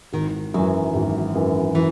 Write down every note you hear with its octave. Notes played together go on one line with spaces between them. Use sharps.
G#1 D#3
F#2 E3 F#3
G#1
F#2 E3
E3